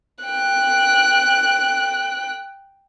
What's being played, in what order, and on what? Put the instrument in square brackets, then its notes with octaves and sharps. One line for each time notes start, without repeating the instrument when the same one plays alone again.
[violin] G5 F#6